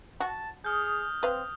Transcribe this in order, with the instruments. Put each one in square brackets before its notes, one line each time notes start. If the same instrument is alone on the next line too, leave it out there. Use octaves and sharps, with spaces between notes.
[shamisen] F#4 [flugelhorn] A5
[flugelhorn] G#4 [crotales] D#6 F6 G6
[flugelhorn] C4 [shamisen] B4 F5